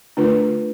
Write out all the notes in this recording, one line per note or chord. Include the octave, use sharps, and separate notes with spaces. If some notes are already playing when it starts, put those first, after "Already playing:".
D3 A3 D4 F4 B4